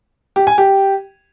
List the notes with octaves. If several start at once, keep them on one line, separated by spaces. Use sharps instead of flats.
G4
G#5
G4